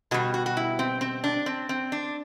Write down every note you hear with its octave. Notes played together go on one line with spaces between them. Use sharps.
B2 G3 F#4
F#4
F#4
E4
C4
C4
D4
C4
C4
D4